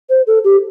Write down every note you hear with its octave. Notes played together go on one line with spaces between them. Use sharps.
C5
A4
G4